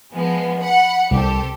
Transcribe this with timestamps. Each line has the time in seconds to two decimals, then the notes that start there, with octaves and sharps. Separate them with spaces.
0.12 F3 G#3 B3
0.60 F#5 B5 C#7
1.11 C2 G4 A4 C5